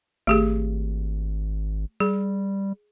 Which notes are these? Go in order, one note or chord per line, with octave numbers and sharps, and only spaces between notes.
G#1 A3 G4 G#4
G3 G#4